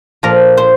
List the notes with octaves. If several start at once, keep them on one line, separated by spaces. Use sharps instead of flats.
A#2 F3 A#4
C5